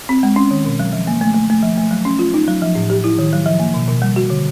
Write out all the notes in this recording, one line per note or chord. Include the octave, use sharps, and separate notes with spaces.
C4
G#3
C#4
D#3
B2
F#3
F3
A#3
A3
A3
A3
F3
A3
F#3
C#4
F4
D#4
F#3
F3
A2
G4
E4
D#3
F#3
F3
A#3
B2
B2
G3
F#4
D3